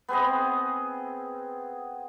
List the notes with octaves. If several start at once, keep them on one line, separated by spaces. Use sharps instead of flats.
B3 C4 G#4 D#5